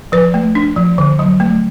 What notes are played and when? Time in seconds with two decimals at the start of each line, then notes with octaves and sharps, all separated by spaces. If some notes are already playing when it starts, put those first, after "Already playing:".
0.12 F3 B4
0.34 A3
0.55 D4
0.76 F3
0.98 D3
1.19 F#3
1.40 A3